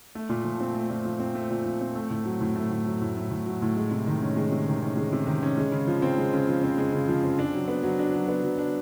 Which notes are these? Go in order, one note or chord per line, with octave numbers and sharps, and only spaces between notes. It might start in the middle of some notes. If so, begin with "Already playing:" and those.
A3
A#2
F3
C4
A3
A#2
F3
C4
A3
A#2
F3
C4
A3
A2
F#3
A2
A3
A2
F#3
A2
A3
A2
F#3
A2
G#3
C3
D#3
C#4
G#3
C3
D#3
C#4
G#3
C3
D#3
C#4
G#3
C#3
F3
C4
G#3
C#3
F3
C4
G#3
C#3
F3
C4
D4
F#3
B3
F#3
D4
F#3
B3
F#3
D4